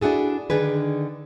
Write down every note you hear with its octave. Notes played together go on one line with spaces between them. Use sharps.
D4 E4 F#4 G#4 A4
D3 D#3 D4 G#4 B4